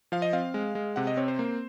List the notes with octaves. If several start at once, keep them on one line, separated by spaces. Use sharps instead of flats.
F3 F5
D#5
C4 F5
G#3
G#3
C3 F#5
D#5
C4 C#5
C5
A#3